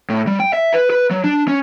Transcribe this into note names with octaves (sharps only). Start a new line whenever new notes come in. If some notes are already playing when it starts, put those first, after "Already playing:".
A2
G3
G5
E5
B4
B4
F#3
D4
C#4